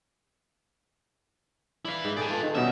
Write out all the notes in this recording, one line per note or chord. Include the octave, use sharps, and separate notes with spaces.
E4 B4 D5 F5
G#2 G5
G#4 A4 B4 D5 G5 G#5
D4 F4 A4 B4
D#3 C4
B2 G3 C#4 D#4 E5 F#5